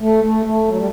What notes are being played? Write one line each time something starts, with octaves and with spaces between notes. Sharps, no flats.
A3
A3
A3
F#3
G3